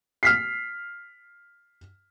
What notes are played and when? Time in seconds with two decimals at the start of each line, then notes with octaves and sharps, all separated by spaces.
0.23 F6 B6 C7